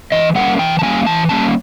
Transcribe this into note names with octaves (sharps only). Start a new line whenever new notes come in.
E3 D#5
G3 A#3 C#4 F#5
E3 G5
A5
G3 A#3 C#4 G#5
E3 A5
G3 A#3 C#4 A5